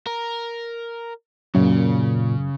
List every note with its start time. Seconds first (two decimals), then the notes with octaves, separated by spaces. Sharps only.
0.07 A#4
1.55 F#2 A#2 C#3